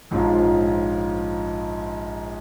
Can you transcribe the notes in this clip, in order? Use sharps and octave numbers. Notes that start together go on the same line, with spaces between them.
A#1 G#2 F3 C#4 F4